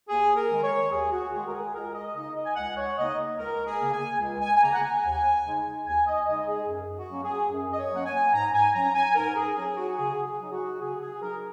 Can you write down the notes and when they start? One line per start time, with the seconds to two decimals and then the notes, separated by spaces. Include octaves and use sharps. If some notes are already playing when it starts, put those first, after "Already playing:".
0.09 D#2 G#4
0.36 A#4
0.50 D#3 G#3
0.64 C#5
0.91 D#2 G#4
1.12 F#4
1.32 D#3 G#3 G#4
1.47 A#4
1.53 G#4
1.74 C#2 A#4
1.94 D#5
2.15 C#3 A#3 D#4 D#5
2.36 D#5
2.45 G#5
2.56 C#2 F#5
2.77 C#5
2.97 C#3 A#3 D#4 D#5
3.38 C#2 A#4
3.67 G#4
3.80 C#3 A#3
3.93 G#5
4.20 C#2
4.41 G#5
4.56 G#5
4.63 C#3 A#3 A#5
4.73 F#5
4.82 G#5
5.04 D#2
5.44 C#3 G#3 D#4
5.86 D#2 G#5
6.07 D#5
6.27 C#3 G#3 D#4 D#5
6.48 G#4
6.68 F#2
6.96 F#4
7.10 F#3 A#3 C#4
7.24 G#4
7.51 F#2
7.73 D#5
7.79 C#5
7.91 F#3 A#3 C#4 F#5
8.05 G#5
8.33 G#2 A#5
8.54 G#5
8.75 F#3 C#4 A#5
8.95 G#5
9.15 G#2 A#4
9.36 G#4
9.57 F#3 C#4 G#4
9.77 F#4
9.98 C#3 G#4
10.25 G#4
10.39 F#3 D#4
10.52 F#4
10.80 C#3 G#4
11.01 G#4
11.21 F#3 D#4 A#4